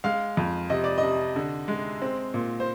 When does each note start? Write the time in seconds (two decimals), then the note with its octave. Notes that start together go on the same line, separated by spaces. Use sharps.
0.04 G#3 F5
0.37 F2
0.70 C3 D#5
0.84 D5
0.98 D#5
1.03 C3
1.36 D3
1.68 G#3
2.02 C4
2.34 A#2
2.60 C5